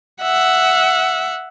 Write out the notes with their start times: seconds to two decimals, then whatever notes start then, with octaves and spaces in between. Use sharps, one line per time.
0.22 E5 F#5